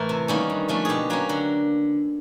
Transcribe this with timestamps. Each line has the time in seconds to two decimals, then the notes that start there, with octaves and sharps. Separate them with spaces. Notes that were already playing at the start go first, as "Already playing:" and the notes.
Already playing: A2 E3 A3 A#4
0.09 C3
0.28 D#3 G3 A#3 C#4
0.50 G2
0.69 D3 F3 A3 C#4
0.85 B2 G4 G#4
1.10 F#3 A#3 C#4
1.29 D3